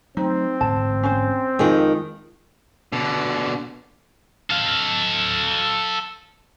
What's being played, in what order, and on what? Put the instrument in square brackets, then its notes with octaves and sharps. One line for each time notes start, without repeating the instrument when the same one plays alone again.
[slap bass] F#3 A3 [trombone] C4 [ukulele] D#4
[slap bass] A1 G#2 D3 [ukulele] A5
[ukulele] C#4 C5
[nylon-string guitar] F2 D#3 [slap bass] G#3 [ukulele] G#4
[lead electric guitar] B2 D3
[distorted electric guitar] A4 F5